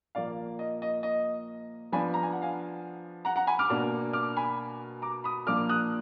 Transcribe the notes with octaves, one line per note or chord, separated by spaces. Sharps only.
A#2 F3 A#3 D5 F5
D#5
D#5
D#5
F3 B3 D4 G#5 B5
A#5
G#5
F#5
F5 G#5
F#5 A#5
F#5 A#5
G#5 B5
D6 F6
B2 A#3 D4
D6 F6
G#5 B5
A#5 D6
B5 D#6
A#2 F3 A#3 D4 D6 F6
D#6 F#6